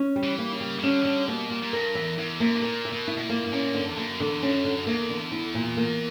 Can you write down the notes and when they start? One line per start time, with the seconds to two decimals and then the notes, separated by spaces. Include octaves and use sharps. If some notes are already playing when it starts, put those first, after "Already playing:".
Already playing: C#4
0.16 G3
0.23 E3
0.38 A#3
0.53 C#3
0.61 G3
0.79 C#3
0.83 D3 C#4
1.01 E3
1.05 D3 G3
1.28 B2 A#3
1.50 A#2 G3
1.62 A#2
1.73 G2 A#4
1.95 E2 E5
2.18 E2 E4
2.40 F#2 A#3
2.55 G2
2.62 A#2 A#4
2.85 E5
2.93 B2
3.08 E4
3.17 B2
3.22 A#2
3.30 A#3
3.45 G2
3.53 A#2 C#4
3.75 G2 D3
3.89 E2
3.97 F#2 A#3
4.20 E2 D3
4.42 F#2 C#4
4.64 D3
4.87 E2 A#3
5.10 D3
5.32 E4
5.54 A#2
5.77 A#3